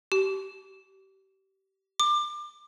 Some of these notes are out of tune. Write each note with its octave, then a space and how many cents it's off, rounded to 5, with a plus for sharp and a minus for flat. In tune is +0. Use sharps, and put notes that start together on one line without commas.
G4 -30
D6 +25